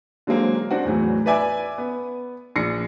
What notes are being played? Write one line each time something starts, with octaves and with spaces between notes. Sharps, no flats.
D3 F#3 G#3 A#3 C4
C4 D4 F#4
E2 A2 E3 F#3
B4 D5 E5 G#5 D6
B3
A#1 A#6 C7 C#7